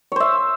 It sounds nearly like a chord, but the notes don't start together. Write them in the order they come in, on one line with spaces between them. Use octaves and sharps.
C#5 C5 E5